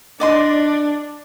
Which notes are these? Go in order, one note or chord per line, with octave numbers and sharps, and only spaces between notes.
D4 D5 D#5 C6